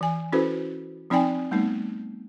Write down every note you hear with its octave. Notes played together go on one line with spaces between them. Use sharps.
E3 G#5
C#4 E4 F#4 A4 B4 C5
F3 C4 D#4 D5 G5 G#5
G3 A3 B3 D#4